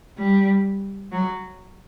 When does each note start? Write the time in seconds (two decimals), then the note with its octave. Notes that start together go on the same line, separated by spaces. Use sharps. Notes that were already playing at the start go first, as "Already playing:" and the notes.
0.18 G3
1.12 F#3